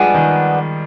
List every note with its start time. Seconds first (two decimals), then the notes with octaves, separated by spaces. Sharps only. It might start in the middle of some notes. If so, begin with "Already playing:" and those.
Already playing: F3 G3 G#3 B3 D4 G#4
0.14 D#3